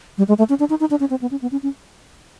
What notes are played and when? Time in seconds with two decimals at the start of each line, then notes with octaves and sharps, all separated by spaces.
0.18 G3
0.28 G#3
0.38 A3
0.49 C#4
0.60 D4
0.70 D#4
0.80 D#4
0.90 D4
1.00 C#4
1.10 C4
1.22 B3
1.31 C#4
1.42 B3
1.52 C#4
1.63 C#4